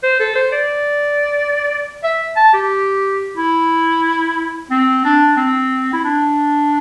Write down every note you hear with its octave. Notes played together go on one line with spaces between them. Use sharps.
C5
A4
C5
D5
E5
A5
G4
E4
C4
D4
C4
E4
D4